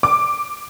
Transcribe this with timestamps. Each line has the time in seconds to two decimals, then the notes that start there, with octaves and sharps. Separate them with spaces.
0.03 D6